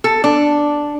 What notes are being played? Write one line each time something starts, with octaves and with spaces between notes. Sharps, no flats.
A4
D4